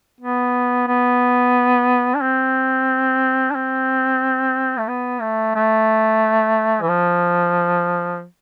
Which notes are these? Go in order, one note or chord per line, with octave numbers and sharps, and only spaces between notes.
B3
B3
D4
C4
D4
C4
A3
B3
A3
A3
E3
F3